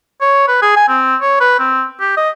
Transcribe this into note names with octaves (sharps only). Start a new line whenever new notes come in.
C#5
B4
G#4
G#5
C4
C#5
B4
C4
G4
D#5